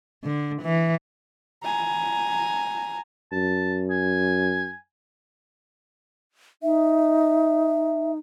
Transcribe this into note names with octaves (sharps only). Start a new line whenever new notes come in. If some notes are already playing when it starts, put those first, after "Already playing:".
D3
E3
G#5 A#5
F#2 A5
G#5
D#4 E5